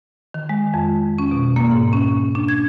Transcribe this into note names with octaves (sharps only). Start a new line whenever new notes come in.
D#3
G#3
F2
C#4
B2
A#3
G#2
C#4
D4
G#6